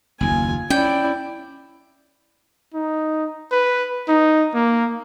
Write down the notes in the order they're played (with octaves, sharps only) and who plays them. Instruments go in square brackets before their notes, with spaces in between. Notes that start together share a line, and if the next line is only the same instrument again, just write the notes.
[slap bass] F#1 D#2 [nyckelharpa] F4 G#5
[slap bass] C#4 [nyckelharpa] E4 D5 [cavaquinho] G5
[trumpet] D#4
B4
D#4
A#3